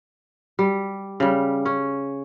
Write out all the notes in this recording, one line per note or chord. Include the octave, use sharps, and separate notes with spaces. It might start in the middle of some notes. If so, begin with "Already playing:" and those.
G3
C#3 G3
C#4